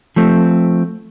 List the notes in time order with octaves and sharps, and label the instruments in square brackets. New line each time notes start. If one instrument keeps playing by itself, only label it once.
[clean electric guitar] F3 A3 C4